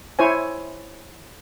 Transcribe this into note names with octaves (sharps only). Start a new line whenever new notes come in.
E4 C5 C#5 G#5